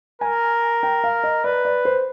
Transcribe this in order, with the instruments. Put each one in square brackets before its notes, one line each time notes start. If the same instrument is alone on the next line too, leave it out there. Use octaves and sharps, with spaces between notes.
[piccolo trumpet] A#4 [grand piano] G#5
[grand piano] G5
F5
D#5
[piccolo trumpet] B4 [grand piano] D5
[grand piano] D5
C5